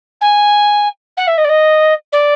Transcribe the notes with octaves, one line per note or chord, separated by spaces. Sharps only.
G#5
F#5
E5
D#5
D5
D#5
D5